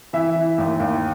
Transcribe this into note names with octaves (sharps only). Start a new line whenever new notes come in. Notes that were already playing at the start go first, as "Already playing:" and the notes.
E3 E5
E3
D#2
D#2